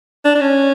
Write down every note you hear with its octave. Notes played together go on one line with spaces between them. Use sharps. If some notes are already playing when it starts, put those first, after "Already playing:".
D4
D4
C#4